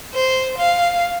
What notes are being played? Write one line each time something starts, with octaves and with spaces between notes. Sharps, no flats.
C5
F5